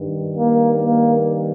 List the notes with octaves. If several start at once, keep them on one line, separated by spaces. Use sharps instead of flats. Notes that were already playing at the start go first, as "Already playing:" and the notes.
Already playing: G2 D#3
A#3
A#3